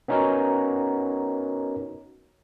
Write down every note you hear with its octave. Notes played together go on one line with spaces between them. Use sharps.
B3 C#4 D#4 F#4 A#4 C#5